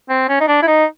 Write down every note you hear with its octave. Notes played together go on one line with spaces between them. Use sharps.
C4
C#4
D#4
D4
E4
D#4